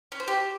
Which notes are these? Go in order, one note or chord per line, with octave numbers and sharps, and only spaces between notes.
C#4
C5
G4